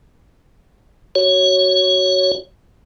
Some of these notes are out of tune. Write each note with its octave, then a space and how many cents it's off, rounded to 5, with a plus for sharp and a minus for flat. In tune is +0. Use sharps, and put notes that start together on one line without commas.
F#4 +15 C#5 +0